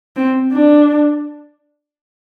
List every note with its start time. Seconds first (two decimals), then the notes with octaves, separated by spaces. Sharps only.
0.16 C4
0.52 D4